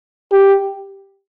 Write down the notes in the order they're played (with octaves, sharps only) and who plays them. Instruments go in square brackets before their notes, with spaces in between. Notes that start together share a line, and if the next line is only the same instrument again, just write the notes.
[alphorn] G4